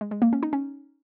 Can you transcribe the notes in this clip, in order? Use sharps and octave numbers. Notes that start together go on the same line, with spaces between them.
G#3
G#3
A#3
C#4
D#4
C#4